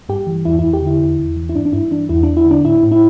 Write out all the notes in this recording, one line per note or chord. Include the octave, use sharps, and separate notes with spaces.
G2 G4
E3
E2 E4
E2 E4
G4
D3 E4
E2
E2
E3
E4
G2 D4
D4
G2 E4
E3 D4
E2 E4
E2 D4
E4
D3
D4
A2 E4
A2
E4